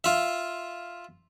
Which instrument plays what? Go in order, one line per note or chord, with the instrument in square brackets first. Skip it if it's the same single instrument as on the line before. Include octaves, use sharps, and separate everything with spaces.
[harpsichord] F4 E5